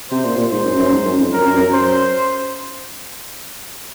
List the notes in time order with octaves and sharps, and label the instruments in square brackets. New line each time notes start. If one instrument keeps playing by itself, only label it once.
[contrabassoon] C3 [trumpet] C5
[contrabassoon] A#2
A#2
[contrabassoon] G#2 [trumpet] C5
[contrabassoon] F#2
F#2
G#2
F#2
F2
[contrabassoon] F#2 [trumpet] A#4
[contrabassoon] F#2
F2
F#2
[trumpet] C5